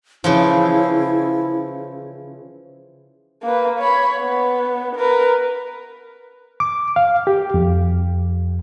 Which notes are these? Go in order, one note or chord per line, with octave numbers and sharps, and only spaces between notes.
C#3 E3 F3 E4
A#3 B4
C#5 B5
B3
A#4 B4
D6
F5
G4
F2